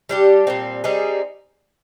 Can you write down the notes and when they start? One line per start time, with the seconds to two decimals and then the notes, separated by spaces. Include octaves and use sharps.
0.09 G3 D4 G4
0.47 A#2 G3 C4
0.84 G3 C4 D#4 G#4